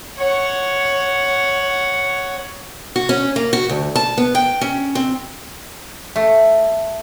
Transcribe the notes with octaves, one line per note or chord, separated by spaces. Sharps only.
C#5 F#5
F#4
C#4
A#3
F#4
D2
A5
B3
G5
C#4
C4
A3